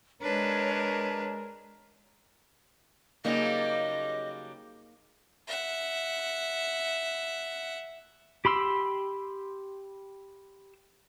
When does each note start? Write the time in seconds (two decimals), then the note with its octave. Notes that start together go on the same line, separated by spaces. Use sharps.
0.22 G#3 D4 A#4 B4 C#5 A5
3.24 C#3 F#3 G3 A#3 D#4 G#4 D#5
5.47 E5 F#5
8.45 G4 B5 C6 E6